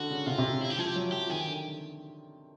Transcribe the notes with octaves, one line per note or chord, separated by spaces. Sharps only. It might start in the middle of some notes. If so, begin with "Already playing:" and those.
Already playing: D3 F#4
C#3
C3 F4
C3
C#3
E4
G4
F3 G#4
G4
F#3
F3 G4
D#3 G#4
G4
D3